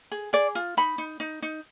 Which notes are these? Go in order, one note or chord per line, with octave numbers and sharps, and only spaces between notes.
G#4
G#4 D5
F4
D#4 B5
D#4
D#4
D#4